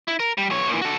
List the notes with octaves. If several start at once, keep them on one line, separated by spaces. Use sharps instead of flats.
E4
A#4
G3
B1 C#5
A#2 E3
F#4 A4